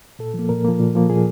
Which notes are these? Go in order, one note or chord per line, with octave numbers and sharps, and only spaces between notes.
A#2 A4
F3 A#3
A#2 A#4
F3 A#3
A#2
F3 A#3
A#2 G#4